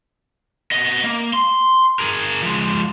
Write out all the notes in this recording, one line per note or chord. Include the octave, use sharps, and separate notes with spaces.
B3 D#5
A#3
C6
G#4 A#4
F3 G#3